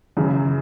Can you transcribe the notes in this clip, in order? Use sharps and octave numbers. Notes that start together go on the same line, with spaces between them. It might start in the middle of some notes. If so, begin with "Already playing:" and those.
F#2 C#3 E3